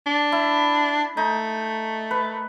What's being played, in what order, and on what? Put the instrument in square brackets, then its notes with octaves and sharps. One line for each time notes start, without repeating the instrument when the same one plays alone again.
[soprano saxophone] D4
[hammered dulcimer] E4
[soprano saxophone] A3 [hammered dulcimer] D#4
[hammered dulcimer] B4